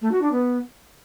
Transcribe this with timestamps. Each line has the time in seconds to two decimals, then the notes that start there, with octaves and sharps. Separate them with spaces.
0.02 A3
0.12 F#4
0.22 D4
0.32 B3